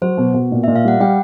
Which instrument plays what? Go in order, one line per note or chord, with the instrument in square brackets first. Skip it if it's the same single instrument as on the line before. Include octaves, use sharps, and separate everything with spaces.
[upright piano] F#3 [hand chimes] C5
[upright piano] B2
B2
A#2
[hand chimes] E5
[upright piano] A#2
[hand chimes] F5
[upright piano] G3 [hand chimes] F#5
[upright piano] G3 [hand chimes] G5